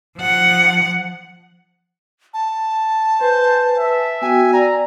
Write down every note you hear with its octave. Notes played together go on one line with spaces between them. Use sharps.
F3 F#5
A5
B4 C5 G#5
E5
B3 F#4 G5 G#5
D5 A#5